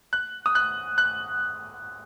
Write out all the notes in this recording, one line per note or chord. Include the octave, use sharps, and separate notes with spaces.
F#6
D#6
F#6
F#6